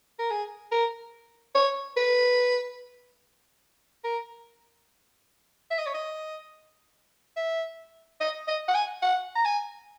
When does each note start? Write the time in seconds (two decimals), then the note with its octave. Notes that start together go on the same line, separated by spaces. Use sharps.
0.19 A#4
0.30 G#4
0.71 A#4
1.55 C#5
1.96 B4
4.04 A#4
5.71 E5
5.78 D#5
5.86 C#5
5.94 D#5
7.36 E5
8.20 D#5
8.48 D#5
8.68 F#5
8.75 G#5
9.02 F#5
9.35 A#5
9.45 G#5